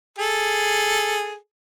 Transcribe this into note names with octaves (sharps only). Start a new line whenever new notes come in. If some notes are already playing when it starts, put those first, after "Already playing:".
G#4 A4